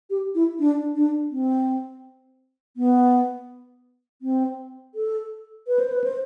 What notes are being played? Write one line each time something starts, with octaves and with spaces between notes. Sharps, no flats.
G4
E4
D4
D4
C4
B3
C4
A4
B4
C5
B4
C5